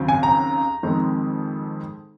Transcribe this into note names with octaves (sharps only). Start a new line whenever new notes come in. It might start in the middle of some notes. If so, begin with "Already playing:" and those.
Already playing: D#2 C#3 F#3 C4
G#5
A#5
F2 D#3 G#3 C4